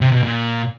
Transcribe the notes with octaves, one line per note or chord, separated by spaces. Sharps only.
C3
B2
A#2